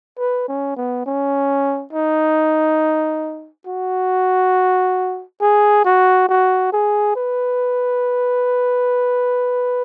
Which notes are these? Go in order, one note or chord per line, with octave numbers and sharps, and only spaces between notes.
B4
C#4
B3
C#4
D#4
F#4
G#4
F#4
F#4
G#4
B4